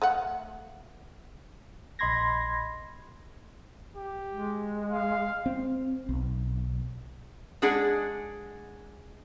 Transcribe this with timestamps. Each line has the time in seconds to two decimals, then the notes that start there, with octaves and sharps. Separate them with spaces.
0.02 A3 F5 F#5
1.99 A#1 D#5 B5 C6 G#6 A#6
3.96 G4
4.32 G#3
4.90 F5
5.46 C4
6.09 B1
7.62 G#3 D4 G#4 F#5